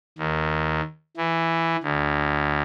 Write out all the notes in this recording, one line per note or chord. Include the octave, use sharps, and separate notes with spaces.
D#2
E3
D2